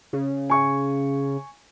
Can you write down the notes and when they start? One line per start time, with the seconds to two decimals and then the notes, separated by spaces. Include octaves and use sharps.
0.13 C#3
0.50 G#5 C#6